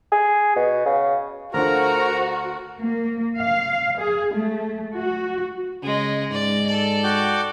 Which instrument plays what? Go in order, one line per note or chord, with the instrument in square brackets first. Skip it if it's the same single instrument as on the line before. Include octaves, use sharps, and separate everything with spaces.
[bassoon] G#4
B2
C#3
[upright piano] D2 D3 F4 [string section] F#4 [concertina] A#4 A#5 [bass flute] C5
[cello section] A#3
F5
G#4
A3
F#4
[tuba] C#3 [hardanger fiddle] G#3 D#5
[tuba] G#2 [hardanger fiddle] D5
[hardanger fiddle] A4 D5
[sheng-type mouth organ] F#4 G5 D6